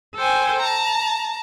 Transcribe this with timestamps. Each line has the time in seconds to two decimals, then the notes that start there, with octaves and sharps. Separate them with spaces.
0.16 A4 C5 G5 G#5
0.59 A5 A#5